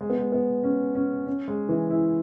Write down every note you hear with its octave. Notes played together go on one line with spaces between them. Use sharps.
G#3
B3
G#3
B3
C#4
C#4
C#4
G#3
E3
E4